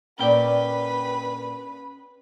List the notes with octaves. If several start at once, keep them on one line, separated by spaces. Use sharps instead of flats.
A#2 C#4 B4 D5 G5 B5